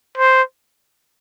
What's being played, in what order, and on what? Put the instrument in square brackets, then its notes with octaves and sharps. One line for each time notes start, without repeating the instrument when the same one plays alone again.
[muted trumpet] C5